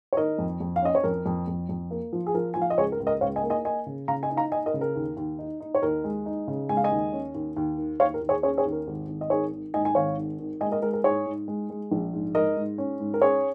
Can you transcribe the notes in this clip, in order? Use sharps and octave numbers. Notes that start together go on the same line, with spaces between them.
C#5
D#3 A#4 D#5
F2
F2
F5
C#4 D#5
C#5
F2 A#4
F2
F2
F2
A#3
F3
G#4
F3 A#4
F3 G#5
F5
D#5
C#2 G#4 C#5
A#4
C#2
A#4 D#5
C#2 C#5 F5
D#5 G#5
A#3
D#5 G#5
A#3 D#5 G#5
C#3
C#3 F5 A#5
D#5 G#5
D#4
F5 A#5
D#4 D#5 G#5
A#4 D#5
C#3
A#4
D#2
D#2
D#4
D#4
C#5
D#2 A#4
G#3
D#4
C#3
G#3 G#5
F5
D#5 G#5
D#2
C#4
D#2
D#2
D#3
D#2 C#5 F5
A#4
D#2
G#4 C#5
C#4 G#4 C#5
G#4 C#5
D#2
A#4
G#1
G#1
D#5
D#3 G#4 C#5
D#3
G#2 D#5 G#5
G#5
G#1 C#5 F5
D#3
D#3
G#3 D#5 G#5
A#4 D#5
G#3 A#4
A#4
G#2 G#4 C#5
G#2
G#3
G#3
A#1
G#2
G#2 A#4 D#5
G#2
C#4
G#2
A#4
C#4 G#4 C#5